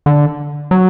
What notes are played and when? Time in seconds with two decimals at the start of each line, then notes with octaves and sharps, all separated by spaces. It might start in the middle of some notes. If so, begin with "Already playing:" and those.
0.06 D3
0.71 F#3